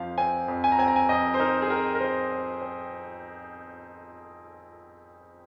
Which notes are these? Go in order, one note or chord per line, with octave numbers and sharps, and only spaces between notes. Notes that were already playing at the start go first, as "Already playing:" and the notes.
Already playing: F2 F3 F5
C4 G#5
F2
G#5
A#5
C4 G#5
A#5
G#5
F2 D#5
C5
D#4 A#4
G#4
C4 A#4
A#4
C4 C5
C4
C4